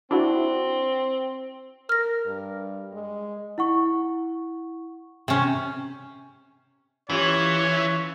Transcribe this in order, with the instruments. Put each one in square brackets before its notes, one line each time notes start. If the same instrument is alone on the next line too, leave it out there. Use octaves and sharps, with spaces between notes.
[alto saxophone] C4 [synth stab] D4 E4 F#4
[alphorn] A#4 [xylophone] F6 A#6
[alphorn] G2
G#3
[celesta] E4 F#5 C#6
[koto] C3 C#4
[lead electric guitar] E3 [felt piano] C#4 F4 G4 [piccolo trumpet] C#5